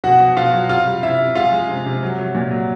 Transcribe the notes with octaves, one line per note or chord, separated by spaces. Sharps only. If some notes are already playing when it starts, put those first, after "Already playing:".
B2 F#4 F#5
B2
B2 F4 F5
F#3
C3 F4 F5
G3
C3 E4 E5
C3
G#3 F4 F5
G#3
C3
C3
F#3
F#3
A#2
F#3